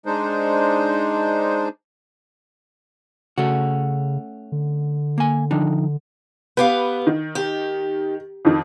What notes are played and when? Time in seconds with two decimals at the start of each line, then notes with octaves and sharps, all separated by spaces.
0.06 G#3 D4 D#4 C5
3.38 C#3 A3 C#4 F#4
4.52 D3
5.18 A#3 G#5
5.51 F3 D4 D#4
6.57 B3 G4 B4 F5
7.07 D#3
7.35 G4
8.45 F2 D#3